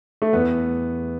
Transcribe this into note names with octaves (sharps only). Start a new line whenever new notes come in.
A3
E2 B3